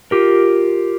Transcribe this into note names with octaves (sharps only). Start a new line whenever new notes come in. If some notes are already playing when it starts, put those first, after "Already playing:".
F4 G4 A#4